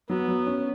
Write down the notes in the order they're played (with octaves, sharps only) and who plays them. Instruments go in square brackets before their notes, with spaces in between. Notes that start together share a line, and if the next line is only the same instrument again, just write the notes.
[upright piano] F#3 [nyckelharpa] B3
[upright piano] F#3
C#4